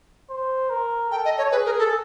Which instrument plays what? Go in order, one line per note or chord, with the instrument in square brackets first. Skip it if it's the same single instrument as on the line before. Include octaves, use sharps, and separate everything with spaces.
[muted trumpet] C5
A#4
[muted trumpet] A4 [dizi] G5
[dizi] D#5
C#5
[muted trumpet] G#4 [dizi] B4
[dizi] A#4
A4